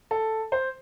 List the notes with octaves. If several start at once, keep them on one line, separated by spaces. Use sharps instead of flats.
A4
C5